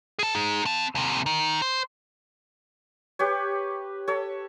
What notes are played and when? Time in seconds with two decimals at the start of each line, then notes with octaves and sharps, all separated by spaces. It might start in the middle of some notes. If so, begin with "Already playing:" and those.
0.19 G#4 A5
0.35 D#4 G#4
0.65 C4 A5
0.95 D#2 C3
1.26 D#3
1.62 C5
3.19 G4 B4 C#5
4.08 A4 C#5